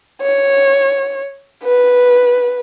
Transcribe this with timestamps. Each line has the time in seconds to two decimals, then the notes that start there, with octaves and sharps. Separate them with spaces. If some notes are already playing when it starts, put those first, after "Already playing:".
0.22 C#5
1.64 B4